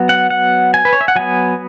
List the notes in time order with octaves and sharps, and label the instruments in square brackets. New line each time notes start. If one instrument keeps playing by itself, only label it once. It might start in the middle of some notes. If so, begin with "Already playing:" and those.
Already playing: [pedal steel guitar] F#3 B3
F#5
F#5
G#5
B4
C#5
E5
F#5
F#3 B3 G#5